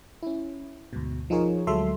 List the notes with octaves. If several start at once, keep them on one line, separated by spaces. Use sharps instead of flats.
C#4 E4
D2 G#2 B2
F3 D#4 F4 G#4 A#4 C#5
D2 F#3 G#3 A4 E5 C6